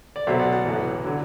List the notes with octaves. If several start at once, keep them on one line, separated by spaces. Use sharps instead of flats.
D5
B1 B2 F#3 C5 E5
D5 F#5
D5 F#5
B1 A2 E3
D3 F#3